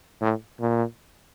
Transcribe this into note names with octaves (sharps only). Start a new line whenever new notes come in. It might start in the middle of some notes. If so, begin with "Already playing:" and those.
A2
A#2